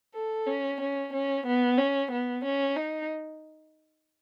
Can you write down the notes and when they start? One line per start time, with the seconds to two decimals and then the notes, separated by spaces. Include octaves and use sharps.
0.15 A4
0.47 C#4
0.81 C#4
1.14 C#4
1.47 B3
1.78 C#4
2.12 B3
2.45 C#4
2.77 D#4